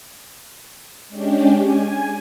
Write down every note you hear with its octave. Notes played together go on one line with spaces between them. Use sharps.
G#3 C#4 D4 G4
G#5